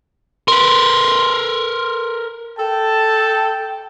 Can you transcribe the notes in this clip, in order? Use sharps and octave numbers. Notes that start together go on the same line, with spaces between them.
A#4 B4 C6
A4 G5 A5